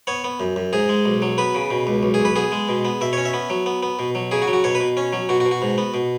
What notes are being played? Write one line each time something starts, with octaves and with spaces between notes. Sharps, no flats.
B3 C#5
B3
F#2
F#2
G#2 G#4
G#3
B1
F#3
B3 B4
C#3
B2
C#2
B1
G#4
B1
B4
B3 G#4
G#3
B2
B3
B2 E5
C#4 C#5
E5
B3
F#3
B3
B3
B2
F#3
C#3 G#4
F#4
F#3
F#4
B2 C#5
B4
B2
C#4
F#3
B2 F#4
F#4
B2
F#4
G#2
B3
B2